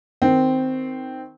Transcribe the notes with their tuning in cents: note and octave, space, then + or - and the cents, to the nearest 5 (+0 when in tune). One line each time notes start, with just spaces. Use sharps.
D#3 +0 C4 -10